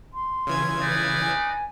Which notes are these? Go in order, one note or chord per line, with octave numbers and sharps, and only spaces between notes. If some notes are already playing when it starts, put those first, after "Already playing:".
C6
C#3 E3 G#6
D#4 B4 D5
G#5